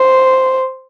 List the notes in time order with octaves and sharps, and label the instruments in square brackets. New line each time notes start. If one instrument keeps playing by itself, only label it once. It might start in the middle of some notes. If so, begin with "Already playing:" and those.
Already playing: [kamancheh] C5